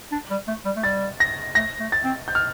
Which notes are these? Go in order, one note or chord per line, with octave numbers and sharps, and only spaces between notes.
D4
G3
A3
G3
A3
G3 A6
A#6
A3 A#6
A3
A6
C4
G6
F6